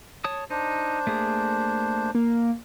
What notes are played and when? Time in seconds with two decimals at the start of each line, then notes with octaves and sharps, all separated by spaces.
0.24 C#5 A5 D#6
0.50 D4 D#4 C5
1.07 A3 A#3 G#4
2.15 A#3